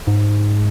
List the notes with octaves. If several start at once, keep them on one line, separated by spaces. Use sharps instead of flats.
G#2